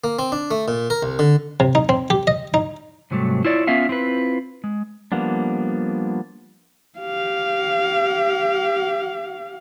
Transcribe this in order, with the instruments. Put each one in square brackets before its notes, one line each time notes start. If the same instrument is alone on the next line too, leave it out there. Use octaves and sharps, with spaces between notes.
[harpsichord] A#3
C4
D4
A3
A#2
A#4
C2
D3
C3
D#4
C4
G4
D#5
D#4
[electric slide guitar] G#2 C3 F#3 G3 A3
E4 F4 C#5 D5
B3 C#4 F4 E5 F5
C4 E4 F4 B4
G#3
[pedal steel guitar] F3 G3 A#3 B3 D4
[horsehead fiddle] G4 F5